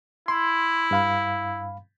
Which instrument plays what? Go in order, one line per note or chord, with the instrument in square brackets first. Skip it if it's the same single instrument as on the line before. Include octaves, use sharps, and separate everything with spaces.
[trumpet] E4 [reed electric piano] C6
[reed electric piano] G2 F5 B5